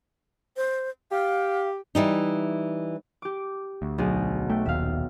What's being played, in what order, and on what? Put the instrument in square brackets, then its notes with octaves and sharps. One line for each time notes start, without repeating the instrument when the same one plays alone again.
[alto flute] C5
[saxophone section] G4 [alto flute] F5
[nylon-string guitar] E3 G3 D#4
[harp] G4 D6
[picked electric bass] D2
[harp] B1 G#4
[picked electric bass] A3 [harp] G5
[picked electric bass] D#1 D#2 [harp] E5 F5